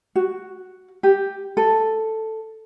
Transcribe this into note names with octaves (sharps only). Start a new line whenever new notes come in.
F#4
G4
A4